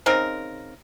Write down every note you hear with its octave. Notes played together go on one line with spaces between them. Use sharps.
C#3 C4 D#4 A#4